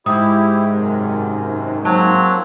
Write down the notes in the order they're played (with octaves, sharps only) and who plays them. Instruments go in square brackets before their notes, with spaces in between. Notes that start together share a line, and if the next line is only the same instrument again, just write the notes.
[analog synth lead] G#2 [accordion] E4 G4 [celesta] D#6
[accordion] F#2 C3 D#3
[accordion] F3 A#3 C4 [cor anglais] F#3 [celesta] A5